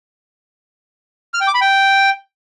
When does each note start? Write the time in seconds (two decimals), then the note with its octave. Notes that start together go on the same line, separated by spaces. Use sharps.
1.34 F6
1.41 G5
1.47 D6
1.54 B5
1.61 G5